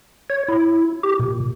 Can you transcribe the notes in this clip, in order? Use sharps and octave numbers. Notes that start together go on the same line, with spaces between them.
C#5
E4
G4
A#2